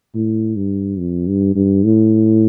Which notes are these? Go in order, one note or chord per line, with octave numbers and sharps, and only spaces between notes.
A2
G2
F2
G2
G2
A2